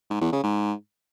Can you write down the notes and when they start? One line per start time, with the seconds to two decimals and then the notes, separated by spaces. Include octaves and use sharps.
0.10 G#2
0.21 E2
0.32 C#3
0.43 G#2